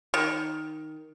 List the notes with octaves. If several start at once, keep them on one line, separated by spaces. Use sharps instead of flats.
D#3